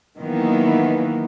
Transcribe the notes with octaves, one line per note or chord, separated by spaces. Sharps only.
D#3 E3 F#3 A#3 B3